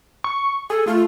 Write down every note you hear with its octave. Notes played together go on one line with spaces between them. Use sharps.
C#6
G#4 A4
A3 F4